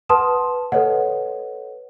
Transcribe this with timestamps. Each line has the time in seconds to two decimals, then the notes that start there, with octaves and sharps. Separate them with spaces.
0.09 B4 F#5 A5 C6 D#6 E7
0.72 A4 B4 C#5 D#5 F#5